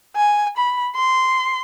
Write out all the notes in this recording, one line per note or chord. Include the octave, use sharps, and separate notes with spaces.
G#5
B5
C6